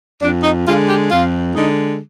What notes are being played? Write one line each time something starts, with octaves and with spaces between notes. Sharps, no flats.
F2 D4
D#4
D3 G#3 F4
G4
F2 F4
D3 G#3 D#4